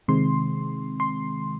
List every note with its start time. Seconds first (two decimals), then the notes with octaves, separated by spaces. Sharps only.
0.08 C3 D#3 G#3 C4 C6
1.00 C6